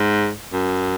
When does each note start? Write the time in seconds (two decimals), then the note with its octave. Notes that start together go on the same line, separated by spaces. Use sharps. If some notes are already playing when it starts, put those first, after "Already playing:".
Already playing: G#2
0.52 F#2